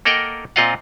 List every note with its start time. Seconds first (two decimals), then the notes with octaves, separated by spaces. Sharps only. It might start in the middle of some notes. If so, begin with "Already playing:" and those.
0.05 A#3 A4 A#4 D#5 F#5 G5
0.56 A#2 C4 F4 D#5 F5 F#5